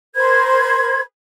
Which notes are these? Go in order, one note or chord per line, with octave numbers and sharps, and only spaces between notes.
A#4 C5 B5 G#6